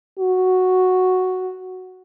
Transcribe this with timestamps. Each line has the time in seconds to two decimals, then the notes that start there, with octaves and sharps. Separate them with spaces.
0.20 F#4